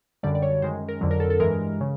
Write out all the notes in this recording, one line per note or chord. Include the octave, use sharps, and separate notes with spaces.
F#2 D3 G3 D5
D5
C#5
F#2 D#3 G#3 C5
A#4
F2 D3 F#3
A#4
A4
A4
G2 E3 G#3 A#4
C#3